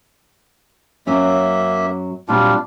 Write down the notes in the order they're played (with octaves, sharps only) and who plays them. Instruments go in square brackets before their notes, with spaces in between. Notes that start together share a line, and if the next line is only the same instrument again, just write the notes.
[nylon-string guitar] F#2 F#3 C#4 [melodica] A#3 E5
[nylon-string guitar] A#2 F#3 C4 [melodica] G3 D4 F4